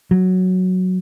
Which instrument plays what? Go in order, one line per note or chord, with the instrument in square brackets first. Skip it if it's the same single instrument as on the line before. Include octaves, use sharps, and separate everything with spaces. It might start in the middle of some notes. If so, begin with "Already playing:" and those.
[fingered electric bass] F#3